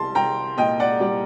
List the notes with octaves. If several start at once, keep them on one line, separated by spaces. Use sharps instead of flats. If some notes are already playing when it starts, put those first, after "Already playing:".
Already playing: C2 G3 A5 C6
C2 G5 A#5
A#2 D#5 G5
D5 F#5
G3 D5